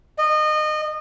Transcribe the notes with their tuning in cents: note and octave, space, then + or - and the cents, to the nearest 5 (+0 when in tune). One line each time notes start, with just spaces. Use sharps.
D#5 -25